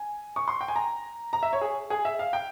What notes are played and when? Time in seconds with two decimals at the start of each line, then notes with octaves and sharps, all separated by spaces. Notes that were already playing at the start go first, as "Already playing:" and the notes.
Already playing: G#5
0.36 C#6
0.48 C6
0.61 G5
0.68 G#5
0.76 A#5
1.33 A#5
1.43 E5
1.53 C#5
1.61 G#4
1.90 G#4
2.05 E5
2.19 F5
2.33 G5